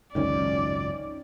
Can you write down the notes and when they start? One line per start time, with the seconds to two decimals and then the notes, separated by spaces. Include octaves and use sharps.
0.15 G#1 C#2 F#2 D#3 C#4 D5